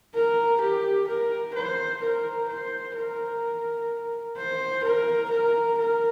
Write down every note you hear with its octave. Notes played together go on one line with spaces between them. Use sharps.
A#4
G4
A#4
C5
A#4
C5
A#4
C5
A#4
A#4
A#4